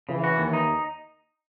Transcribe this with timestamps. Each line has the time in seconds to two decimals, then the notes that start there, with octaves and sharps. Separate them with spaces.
0.09 C#3 E3
0.24 F#4
0.38 D#2
0.53 D#4